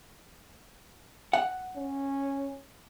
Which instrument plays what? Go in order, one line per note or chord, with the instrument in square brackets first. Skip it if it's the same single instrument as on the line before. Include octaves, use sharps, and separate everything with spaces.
[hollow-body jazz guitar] F#5
[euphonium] C#4